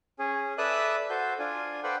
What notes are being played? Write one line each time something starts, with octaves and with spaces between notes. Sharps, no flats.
C#4 G#4
A4 B4 D5 E5 D#6 F#6
F#4 A4 C5 G6
D4 F4 G#5
A4 B4 C5 D5 F#5 G5